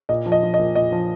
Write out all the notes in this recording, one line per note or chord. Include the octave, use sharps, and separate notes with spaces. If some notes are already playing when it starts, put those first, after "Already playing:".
A#2 D#5
F3
D#5
F3
D#5
A#2
A#2 D#5
F3